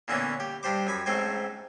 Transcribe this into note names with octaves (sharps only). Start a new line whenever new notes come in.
A#2 D3 E3 A#3 B3 C#4
G4
G2 D4 G4 C5 D6
F#2 G#5 B5
A1 G#2 A3 C4 C5 G#5